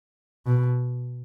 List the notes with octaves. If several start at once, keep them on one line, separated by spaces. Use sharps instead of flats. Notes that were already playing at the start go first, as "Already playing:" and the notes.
B2